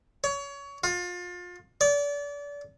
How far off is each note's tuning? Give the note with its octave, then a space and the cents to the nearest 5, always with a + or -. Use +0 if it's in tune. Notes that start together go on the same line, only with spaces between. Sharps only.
C#5 +25
F4 +30
D5 -30